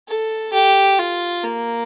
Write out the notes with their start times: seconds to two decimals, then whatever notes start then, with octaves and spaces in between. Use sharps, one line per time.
0.08 A4
0.53 G4
0.99 F4
1.44 A#3